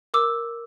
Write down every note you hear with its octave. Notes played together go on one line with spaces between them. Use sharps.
A#4 D6 E6